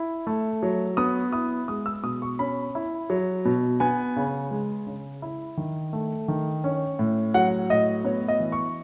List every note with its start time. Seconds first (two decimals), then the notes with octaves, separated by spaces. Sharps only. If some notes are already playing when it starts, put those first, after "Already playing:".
Already playing: E4
0.27 A3
0.63 F#3
0.97 B3 D#6
1.32 E4 D#6
1.68 G#3 D#6
1.86 E6
2.03 B2 D#6
2.22 C#6
2.39 C#4 B5
2.75 E4
3.10 F#3
3.45 B2
3.80 B3 G#5
4.16 C#3
4.51 G#3
4.87 C#3
5.22 E4
5.57 D#3
5.93 A3
6.28 D#3
6.64 C#4
6.99 A2
7.34 F#3 F#5
7.70 A2 D#5
8.05 B3 C#5
8.28 D#5
8.40 E3
8.52 C#6